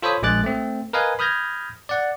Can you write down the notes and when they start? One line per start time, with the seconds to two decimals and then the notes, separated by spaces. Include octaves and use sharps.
0.02 F4 A4 C5 C#5 B5 D#6
0.22 A#1 G#3 G#4 D6 F#6 A6
0.44 A3 C4
0.93 A#4 B4 D#5 F5 G#5
1.19 B5 D#6 F6 G6 G#6 A#6
1.89 D5 F#5